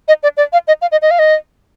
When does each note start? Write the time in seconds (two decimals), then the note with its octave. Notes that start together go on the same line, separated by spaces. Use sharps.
0.08 D#5
0.23 D5
0.37 D5
0.53 F5
0.68 D#5
0.82 F5
0.92 D#5
1.02 D#5
1.11 F5
1.19 D#5